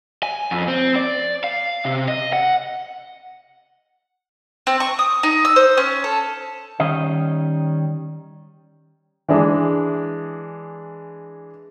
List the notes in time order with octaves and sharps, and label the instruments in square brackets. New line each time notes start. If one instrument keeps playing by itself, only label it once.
[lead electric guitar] G#5
F2
C4
D5
F5
C3
D#5
F#5
[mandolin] C4
C#6
D#6
D#4
E6
C5
C#4
A4
[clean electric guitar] D#3 G3 C#4 D#5
[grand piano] E3 G#3 D4 G#4